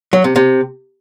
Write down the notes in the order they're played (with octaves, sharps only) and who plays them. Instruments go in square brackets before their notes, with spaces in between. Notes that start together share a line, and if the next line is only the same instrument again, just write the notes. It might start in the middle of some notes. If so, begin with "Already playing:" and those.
[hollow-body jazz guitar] F#3
C3
C3